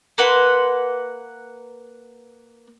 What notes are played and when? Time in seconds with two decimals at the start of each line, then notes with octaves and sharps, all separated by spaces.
0.18 A#3 B4 F#5 C6